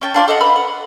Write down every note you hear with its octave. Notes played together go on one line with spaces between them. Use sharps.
C#4 G5 A5
D4 F4 C#5 D5
A4 D#5 F5 F#5
B4 B5 F6
F#5